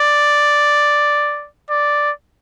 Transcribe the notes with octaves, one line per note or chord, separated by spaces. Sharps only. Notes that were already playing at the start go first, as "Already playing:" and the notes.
Already playing: D5
D5